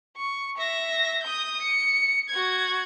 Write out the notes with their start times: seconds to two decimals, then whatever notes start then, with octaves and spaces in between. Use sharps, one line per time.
0.17 C#6
0.58 E5 A#6
1.23 D#6 G6
1.62 C#7
2.29 F#4 G#6